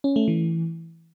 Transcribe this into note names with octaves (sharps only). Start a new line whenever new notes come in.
C#4
A3
E3